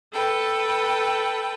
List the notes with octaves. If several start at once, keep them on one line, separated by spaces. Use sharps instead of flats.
A4 B4 G5